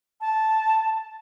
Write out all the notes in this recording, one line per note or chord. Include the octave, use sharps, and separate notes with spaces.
A5